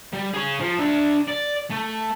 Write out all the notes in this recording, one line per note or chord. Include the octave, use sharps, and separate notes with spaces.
G3
G#4 C#5
F3
D4 E5
D5
A3